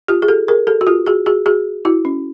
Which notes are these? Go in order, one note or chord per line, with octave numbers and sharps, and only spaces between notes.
F4 G4
G#4
G4 A4
G#4 A#4
G4 A4
F#4
F4 G4
F#4 G#4
F#4 G#4
F#4 G#4
E4 F#4
C#4